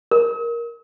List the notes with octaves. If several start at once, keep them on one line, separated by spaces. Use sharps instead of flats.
A#4